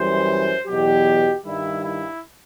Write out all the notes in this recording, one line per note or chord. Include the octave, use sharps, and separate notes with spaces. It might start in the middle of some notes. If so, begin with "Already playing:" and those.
Already playing: F#2 E3 G3 C5
E2 B2 F#3 G4
G2 D#3 G3 E4
E4